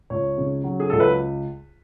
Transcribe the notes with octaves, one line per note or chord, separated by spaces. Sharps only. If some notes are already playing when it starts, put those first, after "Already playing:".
C#2 C#5
C#3
F#3
G#4
C#2 A4
B4